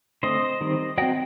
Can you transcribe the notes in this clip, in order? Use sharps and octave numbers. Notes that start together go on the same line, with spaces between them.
D3 A3 C4 C5 D#5
D#3 G3 C4
F#3 C4 D#5 G5